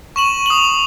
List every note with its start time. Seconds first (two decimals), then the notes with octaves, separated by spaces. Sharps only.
0.16 C#6 E7 F#7
0.46 D#6 F#7